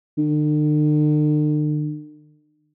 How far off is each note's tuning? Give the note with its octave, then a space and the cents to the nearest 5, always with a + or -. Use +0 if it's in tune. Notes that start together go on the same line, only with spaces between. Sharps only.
D3 +45